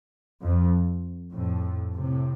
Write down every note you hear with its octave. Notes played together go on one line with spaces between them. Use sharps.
F2
F2 A2
A2 C3